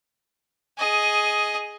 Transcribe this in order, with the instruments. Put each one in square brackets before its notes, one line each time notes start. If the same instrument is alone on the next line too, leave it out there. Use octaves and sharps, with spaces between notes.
[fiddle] G#4 D#5